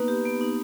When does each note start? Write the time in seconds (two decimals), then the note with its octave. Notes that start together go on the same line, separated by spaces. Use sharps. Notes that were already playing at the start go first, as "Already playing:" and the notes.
Already playing: A#3 B3 D#4 B4
0.08 G4
0.25 B3
0.41 D#4